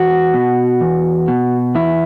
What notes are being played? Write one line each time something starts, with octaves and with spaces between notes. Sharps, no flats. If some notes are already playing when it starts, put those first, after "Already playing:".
Already playing: E2 F#4
B2
E2
B2
E2 E4